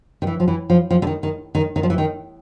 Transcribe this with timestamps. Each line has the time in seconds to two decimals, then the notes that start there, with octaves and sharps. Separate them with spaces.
0.22 D#3
0.27 E3
0.40 F3
0.48 E3
0.70 F3
0.91 F3
1.02 D3
1.07 D#3
1.23 D#3
1.55 D#3
1.76 D#3
1.83 F3
1.90 E3
1.98 D#3